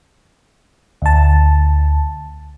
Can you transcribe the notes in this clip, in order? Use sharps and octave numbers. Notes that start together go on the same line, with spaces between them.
D2 A5